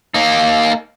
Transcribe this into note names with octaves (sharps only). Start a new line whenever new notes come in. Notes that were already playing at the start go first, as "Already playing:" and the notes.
A#3 D#4